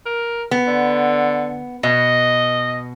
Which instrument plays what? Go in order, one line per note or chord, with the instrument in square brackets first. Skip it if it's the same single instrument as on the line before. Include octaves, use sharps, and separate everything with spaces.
[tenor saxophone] A#4
[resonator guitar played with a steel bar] B3
[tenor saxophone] D3
[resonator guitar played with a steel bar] B2 [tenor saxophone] D#5